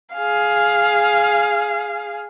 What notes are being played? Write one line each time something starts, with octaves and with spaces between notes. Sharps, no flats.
G#4 F5